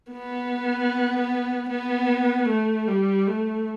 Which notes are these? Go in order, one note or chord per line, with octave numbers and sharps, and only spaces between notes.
B3
B3
A3
G3
A3